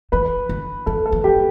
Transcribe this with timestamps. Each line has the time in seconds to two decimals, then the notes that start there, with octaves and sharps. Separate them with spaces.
0.12 E3 B4
0.49 D3
0.86 D3 A4
1.05 A4
1.12 E3
1.24 G4